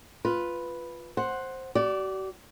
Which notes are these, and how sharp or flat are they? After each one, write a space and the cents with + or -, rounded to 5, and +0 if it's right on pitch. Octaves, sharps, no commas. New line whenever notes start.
F4 +0 B4 +0
C5 +10 F#5 +0
F#4 +45 D5 -10